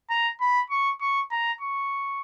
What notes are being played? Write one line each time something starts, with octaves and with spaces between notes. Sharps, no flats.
A#5
B5
C#6
C#6
A#5
C#6